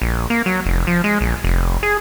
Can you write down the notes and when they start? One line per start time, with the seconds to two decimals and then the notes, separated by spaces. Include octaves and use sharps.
0.02 A#1
0.30 A#3
0.46 F#3
0.66 F1
0.87 F3
1.04 G#3
1.21 A#1
1.44 F1
1.83 G#4